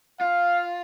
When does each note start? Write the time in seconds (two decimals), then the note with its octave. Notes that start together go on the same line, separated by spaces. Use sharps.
0.21 F4 F5